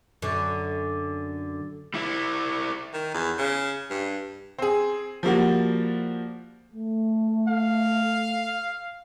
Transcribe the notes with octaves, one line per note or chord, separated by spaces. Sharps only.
F#2 D3
G3 E4
D#3
E2
C#3
G2
C4 G#4
F3 G3 A#3 F#4
A3
F5